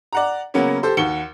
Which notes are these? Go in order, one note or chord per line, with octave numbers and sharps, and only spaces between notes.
D5 F#5 A#5
C#3 F#3 A#3 B3 C#4
G4 A4 C5
D#2 F#4 C#7 G7